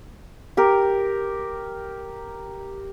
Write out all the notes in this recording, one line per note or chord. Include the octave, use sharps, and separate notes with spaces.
G4 A#4